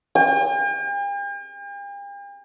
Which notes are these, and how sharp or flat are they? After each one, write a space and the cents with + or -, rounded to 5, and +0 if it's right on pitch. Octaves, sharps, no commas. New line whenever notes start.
G5 +45